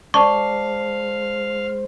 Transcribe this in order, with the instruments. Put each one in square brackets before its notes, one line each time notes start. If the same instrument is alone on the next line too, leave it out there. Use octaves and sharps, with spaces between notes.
[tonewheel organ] G#3 C5 [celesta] D5 A5 D6 [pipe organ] F5 [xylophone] C#6